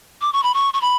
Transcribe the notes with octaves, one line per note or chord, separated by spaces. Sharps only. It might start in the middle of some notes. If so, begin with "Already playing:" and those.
D6
C#6
B5
C#6
C#6
B5